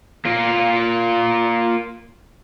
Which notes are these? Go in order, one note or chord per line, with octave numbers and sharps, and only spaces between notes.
A#3 F4